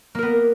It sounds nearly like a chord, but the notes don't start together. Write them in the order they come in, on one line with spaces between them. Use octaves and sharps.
A#3 A#4 B3